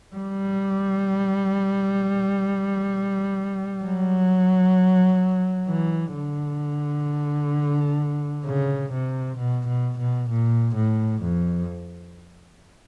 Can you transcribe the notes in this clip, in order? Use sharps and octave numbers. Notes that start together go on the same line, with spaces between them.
G3
F#3
E3
D3
C#3
C3
B2
B2
B2
A#2
A2
F2